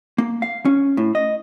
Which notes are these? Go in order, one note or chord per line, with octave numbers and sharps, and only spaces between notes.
A#3
F5
C#4
A2
D#5